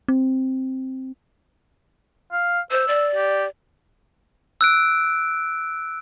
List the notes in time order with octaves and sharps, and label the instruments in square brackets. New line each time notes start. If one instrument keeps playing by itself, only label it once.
[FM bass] C4
[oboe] F5
[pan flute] C5 [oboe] E6
[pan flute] D5
[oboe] G4
[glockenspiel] E6 F#6 D7